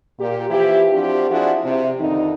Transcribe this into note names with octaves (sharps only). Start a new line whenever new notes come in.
A#2 G4
E3 F3 E4 G4
F3 C4 D4 F#4 G4
F3 D4 E4 F#4 G#4
C3
F2 D3 D#3 D#4